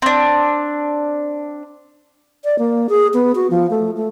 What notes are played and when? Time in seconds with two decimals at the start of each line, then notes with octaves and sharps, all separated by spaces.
0.02 C4 D4
2.45 D5
2.59 A#3
2.89 G#4
3.14 B3
3.35 F#4
3.50 F3
3.70 A3
3.97 A3